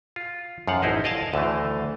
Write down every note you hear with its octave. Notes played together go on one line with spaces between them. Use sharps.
F4
F#2 F3 F5 F#5
A1 D#4 E4 C5 D#5
D5 D#5 F5 G#5 A5
D2 D3 E3 A3